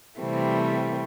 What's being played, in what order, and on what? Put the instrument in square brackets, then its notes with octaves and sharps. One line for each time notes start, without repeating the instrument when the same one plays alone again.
[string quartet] C3 E3 G3 A3 C4